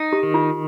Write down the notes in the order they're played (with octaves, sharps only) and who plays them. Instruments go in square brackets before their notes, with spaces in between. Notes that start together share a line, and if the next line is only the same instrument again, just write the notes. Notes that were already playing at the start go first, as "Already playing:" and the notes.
Already playing: [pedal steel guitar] D#4
[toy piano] G4
[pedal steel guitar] D#3
[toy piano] F4